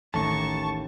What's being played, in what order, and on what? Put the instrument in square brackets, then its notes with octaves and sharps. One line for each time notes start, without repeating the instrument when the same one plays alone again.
[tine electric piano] A1 A3 C#4 [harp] D#2 E3 A#5 [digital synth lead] A5 [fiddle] C#6